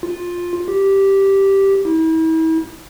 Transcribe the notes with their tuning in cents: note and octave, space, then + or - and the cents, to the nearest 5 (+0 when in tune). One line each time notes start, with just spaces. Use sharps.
F4 +10
G4 -5
E4 -40